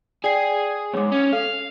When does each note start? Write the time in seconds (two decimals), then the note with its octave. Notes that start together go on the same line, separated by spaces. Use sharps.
0.24 G#4 D5 G5 C7
0.93 D2 G#2 C#5 D6
1.12 C#4
1.33 A4 F5